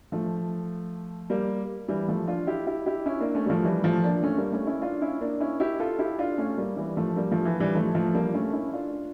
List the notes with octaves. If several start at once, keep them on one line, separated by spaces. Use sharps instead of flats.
F3 A3
G3 A#3
E3 G3
F3 A3
D4 F4
E4 G4
E4 G4
E4 G4
C#4 E4
A#3 D4
A3 C#4
G3
F3 A3
E3 G3
F3 A3
A#3 D4
A3 C#4
G3 A#3
A3 C#4
C#4 E4
D4 F4
C#4 E4
A#3 D4
C#4 E4
E4 G4
F4 A4
E4 G4
D4 F4
A3 C#4
G3 A#3
E3 G3
F3 A3
G3 A#3
F3 A3
E3
E3 G3
F3 A3
F3 A3
G3 A#3
A3 C#4
C#4 E4
D4 F4